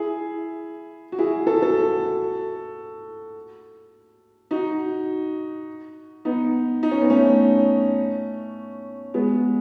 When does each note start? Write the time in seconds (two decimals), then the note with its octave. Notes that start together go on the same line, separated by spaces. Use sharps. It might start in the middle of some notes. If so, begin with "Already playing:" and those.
Already playing: E4 G#4
1.12 F#4
1.19 E4 G#4
1.47 F#4 A4
1.62 F#4 A4
4.51 D#4 F#4
6.25 B3 D#4
6.83 D#4
6.91 C#4
7.01 B3
7.10 A3 C#4
9.14 G#3 B3